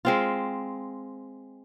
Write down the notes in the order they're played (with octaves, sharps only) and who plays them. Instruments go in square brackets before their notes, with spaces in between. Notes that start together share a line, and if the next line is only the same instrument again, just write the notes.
[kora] G#3 C4 F4